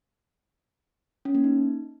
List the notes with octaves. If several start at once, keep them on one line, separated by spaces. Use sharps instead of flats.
C#4
A#3
D#4